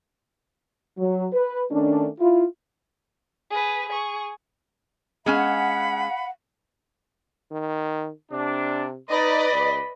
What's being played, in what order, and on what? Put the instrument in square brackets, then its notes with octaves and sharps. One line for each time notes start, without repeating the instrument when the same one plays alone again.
[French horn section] F#3
B4
D#3 A3 C#4 D4
E4 F4
[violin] G#4 B4
G#4 C#6
[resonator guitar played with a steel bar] G#3 C#4 G#5 [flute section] F5 F#5 [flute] B5
[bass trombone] D#3
[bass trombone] C3 [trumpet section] D4
[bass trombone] D#4 [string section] B4 D5 D#5 [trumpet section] B5
[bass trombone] C#2